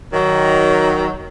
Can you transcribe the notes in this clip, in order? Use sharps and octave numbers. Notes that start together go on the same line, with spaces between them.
D#3 F#3